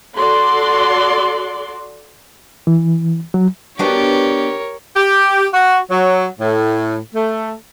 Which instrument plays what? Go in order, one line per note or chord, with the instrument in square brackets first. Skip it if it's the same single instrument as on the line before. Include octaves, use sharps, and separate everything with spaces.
[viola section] F#4 A4 D5 C6
[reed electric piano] E3
F#3
[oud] B3 D4 F#4 [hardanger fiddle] G4 [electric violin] A#4 C#5
[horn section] G4
F#4
F#3
A2
A3